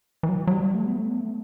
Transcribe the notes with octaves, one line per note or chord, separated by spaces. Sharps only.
E3
F#3
F#3
G3
A3
B3
A3
B3
A3